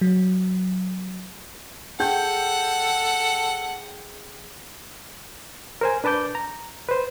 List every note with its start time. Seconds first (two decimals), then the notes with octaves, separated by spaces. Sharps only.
0.01 F#3
2.00 G#4 A4 F#5 G5 G6
5.81 A#4 C5 G#5
6.04 D4 B4 A5 D6 G6
6.35 A#5
6.89 B4 C5